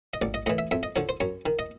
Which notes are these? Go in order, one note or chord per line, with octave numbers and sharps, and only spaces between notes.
D#5
A1 D5
D#5
A2 E3 D#5
E5
F2 E5
D#5
D3 F3 C#5
C5
F#2 C#5
D#3
D#5